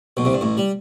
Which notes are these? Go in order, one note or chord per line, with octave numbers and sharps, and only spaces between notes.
B1 B2
C2 C3
G2
A1 A2
G3